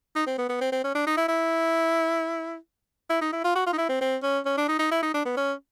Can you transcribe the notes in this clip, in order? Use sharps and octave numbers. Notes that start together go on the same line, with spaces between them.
D#4
C4
B3
B3
C4
C4
C#4
D4
D#4
E4
E4
E4
D#4
E4
F4
F#4
F4
D#4
E4
C4
C4
C#4
C#4
D4
D#4
D#4
E4
D#4
D4
B3
C#4